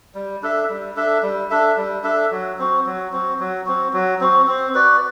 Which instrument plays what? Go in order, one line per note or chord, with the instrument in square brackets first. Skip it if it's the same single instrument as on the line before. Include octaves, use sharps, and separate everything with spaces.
[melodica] G3
D4 A4 E5
G3
D4 A4 E5
G3
D4 A4 E5
G3
D4 A4 E5
F#3
C4 F#4
F#3
C4 F#4
F#3
C4 F#4
F#3
C4 F#4
C4
F#4 B4 D5